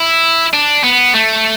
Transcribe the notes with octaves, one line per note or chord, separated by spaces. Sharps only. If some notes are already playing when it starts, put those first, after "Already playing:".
Already playing: E4
D4
B3
A3